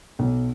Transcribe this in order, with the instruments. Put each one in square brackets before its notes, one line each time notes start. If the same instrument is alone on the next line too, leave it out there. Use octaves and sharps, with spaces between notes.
[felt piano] B1